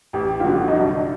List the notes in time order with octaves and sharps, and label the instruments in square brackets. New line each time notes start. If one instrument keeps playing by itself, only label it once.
[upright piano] A1 [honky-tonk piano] G4
[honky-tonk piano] F4
[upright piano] G2 D3 F3 [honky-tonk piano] F#4
[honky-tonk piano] D#4
[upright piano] C2 [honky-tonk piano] D4